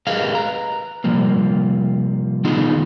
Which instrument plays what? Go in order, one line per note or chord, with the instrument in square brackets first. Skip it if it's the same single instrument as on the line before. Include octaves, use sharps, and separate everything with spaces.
[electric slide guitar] G4 G#4 A#4 B4 D#5 F5
B4 A#5
C3 F3 G3 A#3
D#3 A3 B3 D#4 F4 G#4